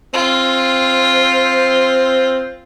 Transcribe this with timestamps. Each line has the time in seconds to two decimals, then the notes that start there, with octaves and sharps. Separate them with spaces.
0.14 C4 F4